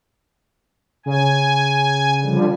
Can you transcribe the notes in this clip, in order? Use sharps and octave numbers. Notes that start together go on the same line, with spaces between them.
C#3 G#5
D3 F3 G3